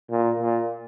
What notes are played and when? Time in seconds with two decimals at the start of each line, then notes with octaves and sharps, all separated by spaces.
0.11 A#2
0.40 A#2